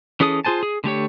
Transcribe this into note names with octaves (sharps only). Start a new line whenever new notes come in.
E3 C#4 G#4 A4 D#6
F4 G#4 C5 G#5 A5
G#4
D3 A3 G4 C#5